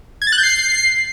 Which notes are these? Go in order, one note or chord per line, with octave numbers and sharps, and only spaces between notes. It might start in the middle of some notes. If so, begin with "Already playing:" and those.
G#6
A6
F#6
G6
C7